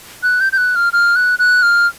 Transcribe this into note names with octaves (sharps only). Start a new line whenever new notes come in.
F#6
G6
G6
F#6
F6
F6
F#6
F#6
F6